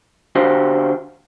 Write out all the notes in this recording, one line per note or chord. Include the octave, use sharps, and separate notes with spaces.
D3 D4 F#4 G4 C5 F5